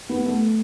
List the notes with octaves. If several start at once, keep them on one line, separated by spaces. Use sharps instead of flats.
B3
A3